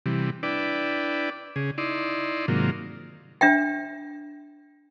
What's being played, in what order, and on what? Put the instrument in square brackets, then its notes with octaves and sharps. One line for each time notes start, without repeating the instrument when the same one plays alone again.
[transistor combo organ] C3 E3 G3
D4 E4 B4 D5 G5
C#3 G#4
D#4 E4 D5 C6
G#2 C3 D#3 F#3 A#3 F4
[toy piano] D4 E5 G5